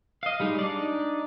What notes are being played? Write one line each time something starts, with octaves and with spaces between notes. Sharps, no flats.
D#5 F5
G3 G#3 D#4
D4 D#4 D5